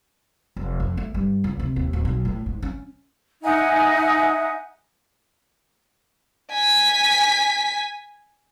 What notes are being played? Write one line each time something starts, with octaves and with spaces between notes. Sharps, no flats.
F1
F2
A3
G2
C#2
C3
D#2
D1
B1
A2
G#2
C#4
D#4 E5 F#5 G#5
G#5 B6